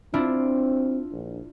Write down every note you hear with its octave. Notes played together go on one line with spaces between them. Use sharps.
C4 D4 E4 F4
A#1